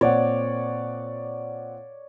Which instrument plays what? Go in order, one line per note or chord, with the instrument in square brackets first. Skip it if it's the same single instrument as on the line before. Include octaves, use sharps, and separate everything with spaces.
[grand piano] A#2 C4 F#5 [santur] C#5 D5